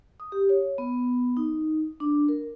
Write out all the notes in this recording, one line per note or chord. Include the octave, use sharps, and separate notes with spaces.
D#6
G4
C#5
B3
D#4
D4
A#4